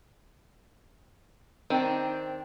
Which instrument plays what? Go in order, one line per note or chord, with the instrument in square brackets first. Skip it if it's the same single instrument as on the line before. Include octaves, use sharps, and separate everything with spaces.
[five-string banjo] D#3 D4 [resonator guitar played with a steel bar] C4 [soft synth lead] G5